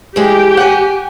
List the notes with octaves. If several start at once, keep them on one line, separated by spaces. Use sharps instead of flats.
E3 G#3 G4
F#5 G#5